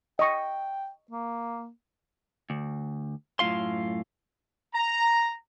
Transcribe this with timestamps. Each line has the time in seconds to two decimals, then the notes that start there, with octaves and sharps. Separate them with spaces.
0.19 D#5 G5 C#6
1.11 A#3
2.50 D2
3.39 F#2 A2 A3 F4 F5 C6
4.74 A#5